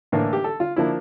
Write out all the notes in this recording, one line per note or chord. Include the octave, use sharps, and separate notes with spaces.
A2 E3 A#3 D4
G4
A4
F4
F3 A#3 D4 E4